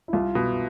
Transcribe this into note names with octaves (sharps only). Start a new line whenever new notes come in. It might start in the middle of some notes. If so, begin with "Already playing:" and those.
E4
C2 F4
B2